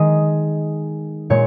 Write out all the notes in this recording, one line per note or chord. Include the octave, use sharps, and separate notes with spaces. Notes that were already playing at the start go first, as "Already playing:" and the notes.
Already playing: D#3 G#3 D#5
A#2 G#3 C#5